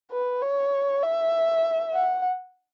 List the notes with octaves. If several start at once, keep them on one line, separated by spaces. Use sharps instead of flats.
B4
C#5
E5
F#5